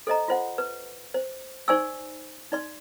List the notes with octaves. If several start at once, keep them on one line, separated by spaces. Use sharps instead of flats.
A4 C5 D#5 A#5
F4 C5 F#5
B4
C5
D#4 C5 D5 G#5 C#6 E6
D#4 D5 C6